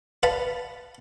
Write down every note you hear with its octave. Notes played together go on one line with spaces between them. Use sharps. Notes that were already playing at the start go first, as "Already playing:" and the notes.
B4 F5 F#5 A5 B5